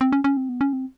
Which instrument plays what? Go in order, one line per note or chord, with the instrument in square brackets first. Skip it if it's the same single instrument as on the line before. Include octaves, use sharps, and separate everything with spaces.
[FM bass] C4
C#4
C#4
C4
B3
C#4
C4